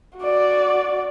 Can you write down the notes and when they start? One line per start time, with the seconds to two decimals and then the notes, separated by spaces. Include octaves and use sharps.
0.18 F#4 D5